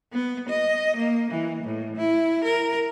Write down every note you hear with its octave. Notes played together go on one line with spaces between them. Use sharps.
B3
D#5
A#3
E3
A2
E4
A#4